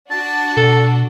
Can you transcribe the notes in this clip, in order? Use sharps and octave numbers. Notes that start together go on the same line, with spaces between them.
D4 F#4 A5
B2 A4